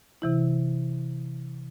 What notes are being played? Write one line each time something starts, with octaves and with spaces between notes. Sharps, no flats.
C3 E3 E4